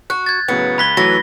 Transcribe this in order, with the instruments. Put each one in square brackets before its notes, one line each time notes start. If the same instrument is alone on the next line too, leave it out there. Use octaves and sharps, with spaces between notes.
[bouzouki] F#4 [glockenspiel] F#6
[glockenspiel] G#6 A6
[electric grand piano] A2 C#3 F#3 [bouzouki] B3
[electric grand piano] C#2 F#6 G#6 [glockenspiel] B5 B6 G7
[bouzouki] E3 [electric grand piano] F#3 A3 F#4 [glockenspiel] A#6